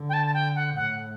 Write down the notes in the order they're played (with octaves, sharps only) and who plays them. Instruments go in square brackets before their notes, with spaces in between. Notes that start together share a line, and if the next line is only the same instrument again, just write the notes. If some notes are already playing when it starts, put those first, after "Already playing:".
Already playing: [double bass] D3
[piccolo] G5
A5
A5
G5
F#5
[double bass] A2 [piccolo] F#5